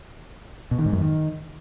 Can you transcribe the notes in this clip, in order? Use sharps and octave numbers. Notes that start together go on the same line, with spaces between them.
B2
D#3
G#2
F#2
D#3